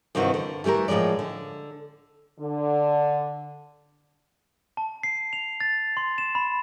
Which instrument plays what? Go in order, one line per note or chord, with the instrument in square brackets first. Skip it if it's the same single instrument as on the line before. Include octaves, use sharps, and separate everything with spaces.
[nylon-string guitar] G2 C3 D#3 E3 C4 F#4
D3
E3 G3 A3 G4 A#4
A2 F3 F#3 G#3 D5
D3
[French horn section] D3
[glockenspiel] A5
C7
F7
A6
C6
E7
B5